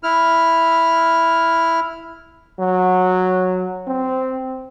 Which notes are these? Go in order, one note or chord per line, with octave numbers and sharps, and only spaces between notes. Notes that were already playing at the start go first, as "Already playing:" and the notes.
E4 F6
F#3
C4